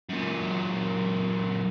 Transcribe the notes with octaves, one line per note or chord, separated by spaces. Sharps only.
F#2 A#2